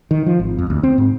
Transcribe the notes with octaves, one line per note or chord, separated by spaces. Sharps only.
D#3
F3
G#1
F2
D2
C4
G#2